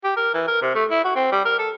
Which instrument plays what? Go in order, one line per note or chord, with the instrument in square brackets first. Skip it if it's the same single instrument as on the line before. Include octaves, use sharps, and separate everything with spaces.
[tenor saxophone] G4
A#4
E3
A#4
C3
A3
E4
F#4
C4
G3
A#4
A4